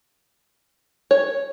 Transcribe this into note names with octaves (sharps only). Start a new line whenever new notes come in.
C#5